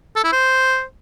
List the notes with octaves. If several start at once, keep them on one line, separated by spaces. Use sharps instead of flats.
A4
E4
C5